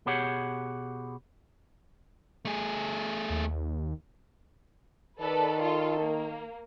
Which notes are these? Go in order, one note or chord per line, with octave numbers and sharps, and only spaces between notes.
B2 G4 G#4 C#5 F#5
A3 G#4
D#2
D#3 A4 B4 D5
F4 A4
A#3